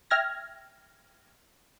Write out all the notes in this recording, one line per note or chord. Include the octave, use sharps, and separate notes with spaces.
E5 G5 F6 G#6 A#6